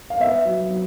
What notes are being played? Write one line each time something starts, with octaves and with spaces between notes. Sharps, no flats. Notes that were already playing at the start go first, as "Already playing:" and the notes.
F5
B3 E5
F#3
F#3